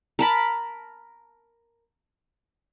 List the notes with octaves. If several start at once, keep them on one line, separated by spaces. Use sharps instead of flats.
A#4 A5 B5